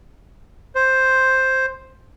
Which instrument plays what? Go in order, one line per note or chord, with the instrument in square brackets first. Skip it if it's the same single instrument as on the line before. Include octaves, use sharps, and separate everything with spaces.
[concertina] C5